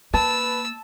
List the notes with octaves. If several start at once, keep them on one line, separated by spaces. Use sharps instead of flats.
A#3 B4 A5 E6